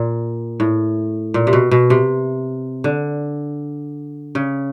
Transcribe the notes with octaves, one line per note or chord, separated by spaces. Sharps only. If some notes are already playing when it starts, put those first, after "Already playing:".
Already playing: A#2
A2
A#2
C3
B2
B2
C3
D3
C#3